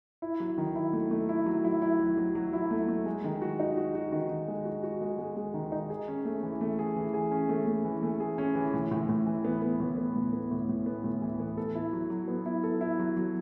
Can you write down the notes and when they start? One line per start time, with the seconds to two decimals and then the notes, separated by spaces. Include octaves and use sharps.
0.22 E4
0.40 F#3
0.58 D#3
0.76 E4
0.93 A3
1.11 A3
1.29 E4
1.46 F#3
1.65 E4
1.82 E4
2.00 F#3
2.18 F#3
2.35 F#3
2.53 E4
2.71 A3
2.88 A3
3.06 G#3
3.24 D#3
3.42 F#4
3.60 D#4
3.77 F#4
3.95 F#4
4.12 D#3
4.30 D#3
4.48 G#3
4.65 F#4
4.83 F#4
5.01 G#3
5.19 G#3
5.36 G#3
5.54 D#3
5.72 D#4
5.90 G#4
6.08 C#4
6.25 A3
6.43 E3
6.61 A3
6.79 G#4
6.96 E3
7.14 G#4
7.31 C#4
7.49 A3
7.67 A3
7.85 E3
8.03 A3
8.20 G#4
8.38 C#4
8.55 E3
8.73 A2
8.91 A2
9.09 A2
9.26 E3
9.45 B3
9.62 B3
9.80 A2
9.98 B3
10.16 A2
10.33 B3
10.51 A2
10.69 A2
10.86 B3
11.04 A2
11.22 E3
11.40 B3
11.57 A4
11.75 E4
11.93 F#3
12.10 F#3
12.28 B3
12.46 E4
12.64 A4
12.81 E4
12.99 F#3
13.17 F#3